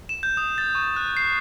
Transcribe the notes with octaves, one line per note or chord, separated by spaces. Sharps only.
E7
G6
D#6
A6
C#6
F#6
C7